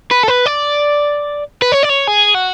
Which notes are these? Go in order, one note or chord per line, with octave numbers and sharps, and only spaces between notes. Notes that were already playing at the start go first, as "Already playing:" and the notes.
B4
A4
B4
D5
B4
C#5
D5
C#5
G#4
F#4